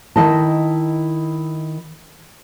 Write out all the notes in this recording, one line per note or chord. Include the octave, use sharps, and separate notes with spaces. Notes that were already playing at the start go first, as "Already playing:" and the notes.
D#3 E4 D#5 A5